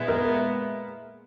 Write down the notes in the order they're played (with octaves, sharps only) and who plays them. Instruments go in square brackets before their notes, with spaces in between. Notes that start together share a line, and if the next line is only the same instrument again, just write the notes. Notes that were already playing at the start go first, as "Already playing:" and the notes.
Already playing: [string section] A#2 G#3 B3 E4
[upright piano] A#4